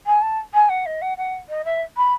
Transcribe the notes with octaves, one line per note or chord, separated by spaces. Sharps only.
G#5
A5
G#5
F#5
D#5
F#5
F#5
D#5
E5
B5